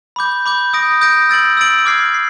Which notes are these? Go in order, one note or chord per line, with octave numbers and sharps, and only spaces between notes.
B5 D6 G6
B5 D6 G6
D#6 G6 A#6 D7
D#6 G6 A#6 D7
E6 A6 D7 F#7
E6 A6 D7 F#7
D6 F6 G#6 C7
C7